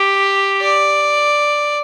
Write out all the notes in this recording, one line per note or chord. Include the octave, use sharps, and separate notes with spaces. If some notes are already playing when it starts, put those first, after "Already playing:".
Already playing: G4
D5